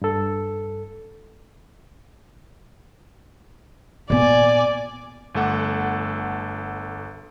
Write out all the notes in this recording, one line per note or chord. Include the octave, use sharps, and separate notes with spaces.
G2 A4
A#2 B3 D5 G#5
G1 A3 A4 F#5 D6